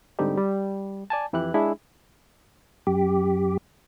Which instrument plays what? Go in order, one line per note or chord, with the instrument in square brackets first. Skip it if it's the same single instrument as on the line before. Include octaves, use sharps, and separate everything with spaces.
[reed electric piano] G#2 D3 G3 C4 D#4 G4
G3
D5 G#5 A5
F2 E3 E4 G4 F#6
G#3 D4 E4 G#4
[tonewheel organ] F#2 G4